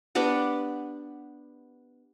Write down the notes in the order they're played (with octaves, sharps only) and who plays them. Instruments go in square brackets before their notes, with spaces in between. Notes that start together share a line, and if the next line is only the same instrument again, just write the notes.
[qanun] B3 D4 G4 F#5